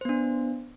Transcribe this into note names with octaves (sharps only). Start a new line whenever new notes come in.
B3 D4 C5